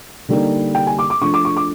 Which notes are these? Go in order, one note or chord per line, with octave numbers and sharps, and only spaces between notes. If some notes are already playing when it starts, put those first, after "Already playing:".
D3 G3 A#3 D#4
G5
G#5
D6
D6
F3 A3 D4 C#6
D6
C#6
D6